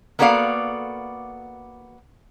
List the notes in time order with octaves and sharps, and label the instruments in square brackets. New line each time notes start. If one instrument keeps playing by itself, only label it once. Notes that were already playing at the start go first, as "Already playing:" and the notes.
[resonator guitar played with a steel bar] A#3 B3 F#4 A4 D5 F5